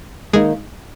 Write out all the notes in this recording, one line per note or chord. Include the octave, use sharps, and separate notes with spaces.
D#3 G#3 A#3 D#4 G#4